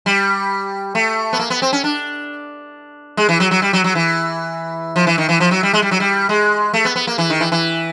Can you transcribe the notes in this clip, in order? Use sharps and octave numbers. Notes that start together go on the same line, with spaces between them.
G3
A3
B3
A#3
B3
C4
C#4
D4
G#3
E3
F#3
F#3
G3
F#3
F#3
E3
F3
E3
D#3
E3
F3
F#3
G3
G#3
G3
F#3
G3
G#3
A3
B3
B3
A#3
E3
D#3
E3
E3